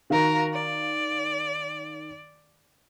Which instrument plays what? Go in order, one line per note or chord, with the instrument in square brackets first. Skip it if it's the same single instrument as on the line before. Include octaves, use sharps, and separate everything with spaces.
[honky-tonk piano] D#3 F5 [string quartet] F#4 A#4 A#5
[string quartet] D5